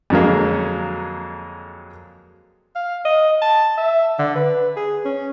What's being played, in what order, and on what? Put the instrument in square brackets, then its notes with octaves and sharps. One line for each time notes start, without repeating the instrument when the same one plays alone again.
[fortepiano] F2 D3 F#3 G#3 A#3
[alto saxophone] F5
D#5
A5
E5
D3
B4
G#4
C#4